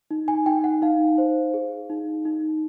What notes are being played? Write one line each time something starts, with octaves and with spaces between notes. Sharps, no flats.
D#4
G#5
D#4 G5
F#5
D#4 F5
C5
G#4
D#4
D#4